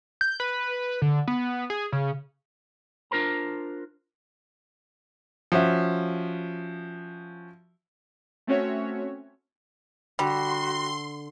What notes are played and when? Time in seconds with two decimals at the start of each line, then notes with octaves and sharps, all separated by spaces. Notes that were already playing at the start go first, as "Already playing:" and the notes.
0.21 G6
0.40 B4
1.02 D3
1.28 B3
1.70 G#4
1.92 C#3
3.11 D4 F4 A#4 C5 A#5
5.52 F3 C#4 F#4 E5
8.47 A3 C4 C#4 F#4 C#5 E5
10.19 D3 G3 F#4 C6